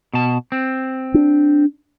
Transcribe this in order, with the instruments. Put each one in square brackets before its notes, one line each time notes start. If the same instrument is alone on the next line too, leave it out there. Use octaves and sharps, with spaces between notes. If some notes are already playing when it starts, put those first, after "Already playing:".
[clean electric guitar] B2 A5
C4
[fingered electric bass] D4